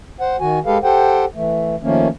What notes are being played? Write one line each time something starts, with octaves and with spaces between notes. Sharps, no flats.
C5 F#5
D#3 F#4 G#5
G#3 G4 A4 B4 F5
G4 A4 C5 F#5 G5
E3 A3
D#3 F3 A3 A#3 C#4